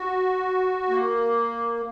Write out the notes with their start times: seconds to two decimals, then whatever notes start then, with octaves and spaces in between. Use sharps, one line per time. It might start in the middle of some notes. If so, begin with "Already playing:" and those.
Already playing: F#4
0.89 A#3